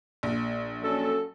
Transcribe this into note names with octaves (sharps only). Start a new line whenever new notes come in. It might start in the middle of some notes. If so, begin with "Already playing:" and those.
A#1
F#3 C#4 A4